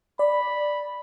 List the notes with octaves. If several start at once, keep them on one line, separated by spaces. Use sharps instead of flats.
D5 B5